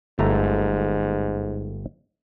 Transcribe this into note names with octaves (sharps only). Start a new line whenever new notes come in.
G1 G#2 A3 A#5